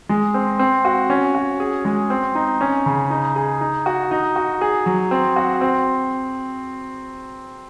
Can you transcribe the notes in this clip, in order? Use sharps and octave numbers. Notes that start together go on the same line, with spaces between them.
G#3
C4
C4
F#4
C#4
F#4
G#4
G#3
C4
D#4
C#4
C#3
D#4
G#4
D#4
F#4
D#4
F#4
G#4
F#3
C4
F#4
C4